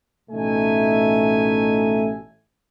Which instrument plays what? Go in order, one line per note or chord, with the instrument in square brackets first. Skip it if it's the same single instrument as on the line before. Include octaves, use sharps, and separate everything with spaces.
[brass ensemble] A1 B2 A3 D#4 E5 G#5